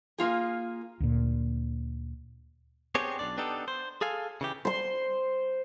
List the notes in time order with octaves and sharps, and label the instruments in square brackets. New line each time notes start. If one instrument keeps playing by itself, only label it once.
[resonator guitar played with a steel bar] A#3 F4 G#4
[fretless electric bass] D2 A#2
[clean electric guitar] B3 C4 D4 G4 G#4 C#5
B1 F2 D4 D5
B3 D4 D#4 G4 A4
C5
G#4 A4 F5 G#5
C#3 E3 G4
[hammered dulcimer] C5 C6